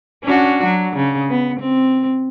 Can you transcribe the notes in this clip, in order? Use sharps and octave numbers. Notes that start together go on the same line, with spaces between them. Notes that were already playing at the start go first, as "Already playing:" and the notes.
C#4 D4 F#4
F#3
C#3
B3
C4